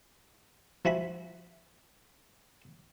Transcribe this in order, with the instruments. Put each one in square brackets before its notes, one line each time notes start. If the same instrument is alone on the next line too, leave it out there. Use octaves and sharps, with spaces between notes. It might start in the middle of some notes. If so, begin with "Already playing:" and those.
[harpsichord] F3 E4 F#4 G#5 B5